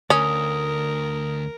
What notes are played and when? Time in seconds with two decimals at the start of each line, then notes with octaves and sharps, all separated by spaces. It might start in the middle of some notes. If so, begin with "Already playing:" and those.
0.10 D2 C#4 A#4 D#6